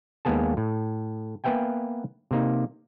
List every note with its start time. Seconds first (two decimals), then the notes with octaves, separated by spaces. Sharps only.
0.25 D#2 G#3 A#3 B3 G#4 A5
0.57 A2
1.44 A#3 B3 B4 E5 G5 G#5
2.31 C3 A#3 D#4